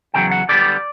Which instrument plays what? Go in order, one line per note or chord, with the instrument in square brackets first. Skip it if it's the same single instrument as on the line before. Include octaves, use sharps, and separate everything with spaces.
[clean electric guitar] E2 C#3 F#3 G5
F#5
D3 G3 B3 D5